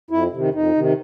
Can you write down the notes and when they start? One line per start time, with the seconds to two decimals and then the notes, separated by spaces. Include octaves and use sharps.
0.10 F2 E4
0.32 C3 D#3
0.54 F2 D#4
0.75 C3 D#3